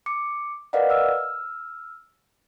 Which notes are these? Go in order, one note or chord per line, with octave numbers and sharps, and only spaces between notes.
D6 C#7
A#4 B4 D5 D#5 F5 F#5
E6 F6